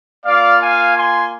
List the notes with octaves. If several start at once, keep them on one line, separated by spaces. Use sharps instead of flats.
A#3 F4 D5 F5
F5 G#5
G#5 C6